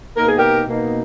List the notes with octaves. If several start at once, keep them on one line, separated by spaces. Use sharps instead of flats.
B2 A#3 D#4 A#4
G#4
G4 A#4
B2 A#3 D#4